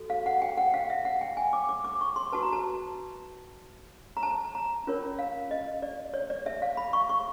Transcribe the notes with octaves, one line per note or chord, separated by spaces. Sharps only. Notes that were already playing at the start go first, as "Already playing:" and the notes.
Already playing: F#4 A4
F5
F#5
G5
F#5
F5
E5
F#5
G5
G#5
D6
D6
D6
C#6
C6
F#4 B4 A5
A#5
A5
A#5
A5
A#5
C#4 F4 A#4 C#5
F5
D#5
D5
C#5
D5
E5
F5
B5
C#6
C#6